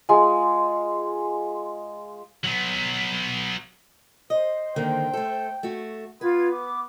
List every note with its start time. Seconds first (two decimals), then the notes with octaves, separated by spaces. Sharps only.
0.09 G#3 F4 G#4 G#5
2.44 F#3 B3
4.30 C5 D#5
4.76 D3 D#3 A#3 G5
5.13 A3 A4
5.63 A3 F#4
6.21 B3 F4 B4 G#6
6.52 D6